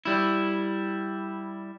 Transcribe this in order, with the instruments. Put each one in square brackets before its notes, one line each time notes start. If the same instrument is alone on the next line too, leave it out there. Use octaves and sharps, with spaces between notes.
[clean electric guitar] G3 E4